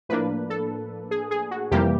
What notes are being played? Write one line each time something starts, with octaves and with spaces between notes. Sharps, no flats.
A2 F3 A#3 D4 B4
A4
G#4
G#4
F#4
F2 C3 E3 G3 A#3 G4